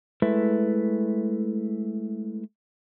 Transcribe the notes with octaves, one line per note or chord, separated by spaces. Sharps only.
G#3 A3 E4 A4 B4 E5